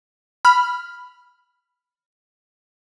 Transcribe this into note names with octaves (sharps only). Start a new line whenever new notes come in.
B5 F6